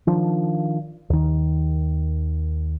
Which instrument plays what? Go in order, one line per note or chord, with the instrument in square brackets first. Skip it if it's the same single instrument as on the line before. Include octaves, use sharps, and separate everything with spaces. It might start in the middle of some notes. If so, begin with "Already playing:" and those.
[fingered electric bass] D#3 F3 D4
D#2 D#3